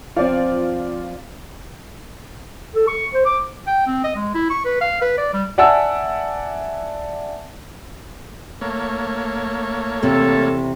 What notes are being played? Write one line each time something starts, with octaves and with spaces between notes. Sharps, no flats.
F3 C4 F4 D5
A4
C#6
C5
D6
G5
C4
D#5
G#3
E4
C#6
B4
F5
B4
D5
G3
D5 E5 F#5 G#5 A5 E6
A3 A#3 C#5
E2 C3 A4